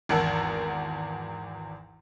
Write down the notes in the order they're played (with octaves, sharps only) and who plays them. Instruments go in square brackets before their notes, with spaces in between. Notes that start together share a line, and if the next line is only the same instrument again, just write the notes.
[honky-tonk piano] G#1 E2 A#4 F#5 A5 E6